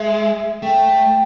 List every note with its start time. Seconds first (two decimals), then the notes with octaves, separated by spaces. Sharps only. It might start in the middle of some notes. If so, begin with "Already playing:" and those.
Already playing: G#3 E5
0.62 A3 G5